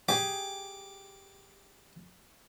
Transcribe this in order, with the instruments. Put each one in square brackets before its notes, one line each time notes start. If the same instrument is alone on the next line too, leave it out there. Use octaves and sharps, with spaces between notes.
[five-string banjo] G4 G#4 [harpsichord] D6